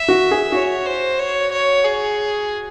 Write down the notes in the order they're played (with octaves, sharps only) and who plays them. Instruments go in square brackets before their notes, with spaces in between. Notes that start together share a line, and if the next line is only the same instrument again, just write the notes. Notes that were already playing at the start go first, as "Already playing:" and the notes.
Already playing: [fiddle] E5
[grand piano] F#4
G#4
[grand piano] F#4 [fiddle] C#5
[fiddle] C5
C#5
C#5
G#4